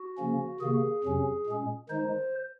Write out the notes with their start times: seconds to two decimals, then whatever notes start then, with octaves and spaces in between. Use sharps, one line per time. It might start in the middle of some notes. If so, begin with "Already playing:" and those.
Already playing: F#4
0.18 C#3 F3 A#3 C#4
0.60 C3 D#3 A#3 G#4
1.04 F2 C3 F#3 C#4
1.46 A#2 G#3 C#4
1.89 D#3 G#3 D#4 C5